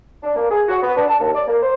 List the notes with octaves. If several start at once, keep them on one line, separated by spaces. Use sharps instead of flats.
D4
A#3
G#4
F#4
B3
D4
A5
D#2
D5
A#3
C5